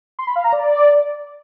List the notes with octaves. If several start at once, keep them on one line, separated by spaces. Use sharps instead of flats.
C6
B5
F5
A#5
D5